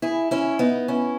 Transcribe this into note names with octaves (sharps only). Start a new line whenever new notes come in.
E4 G#4
C#4 E4
B3 D#4
C#4 E4